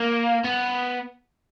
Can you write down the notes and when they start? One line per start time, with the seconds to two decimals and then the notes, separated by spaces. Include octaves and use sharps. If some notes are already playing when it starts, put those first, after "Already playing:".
Already playing: A#3
0.44 B3